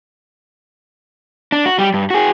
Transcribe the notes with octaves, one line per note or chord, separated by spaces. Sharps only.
D4
F#4
G3 G4
G2
F#4 G#4